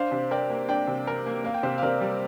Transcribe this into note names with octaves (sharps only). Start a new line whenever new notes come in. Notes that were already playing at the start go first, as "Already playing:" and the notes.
Already playing: D4 C5 F5
C3
A#4 D5 G5
A#3
D4 D5 G5
C3
A#4
A#3
A#3 F5
G5
C3 C5 F5
F5
C3 A#4 D5
G3